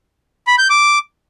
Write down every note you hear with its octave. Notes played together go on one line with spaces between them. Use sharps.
B5
G6
D6